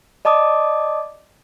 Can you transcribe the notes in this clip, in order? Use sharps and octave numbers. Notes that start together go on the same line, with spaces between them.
D5 D#5 A5 D6 D#6